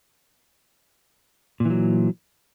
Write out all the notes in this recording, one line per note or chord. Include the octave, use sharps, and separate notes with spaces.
A#2 E3 F#3